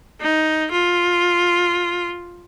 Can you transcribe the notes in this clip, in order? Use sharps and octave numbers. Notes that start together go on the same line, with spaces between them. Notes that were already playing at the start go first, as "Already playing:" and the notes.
D#4
F4